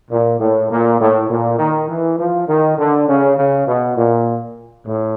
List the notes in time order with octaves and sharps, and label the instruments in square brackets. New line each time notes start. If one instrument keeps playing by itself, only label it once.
[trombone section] A#2
A2
A#2
A2
A#2
D#3
E3
F3
D#3
D3
C#3
C#3
B2
A#2
A2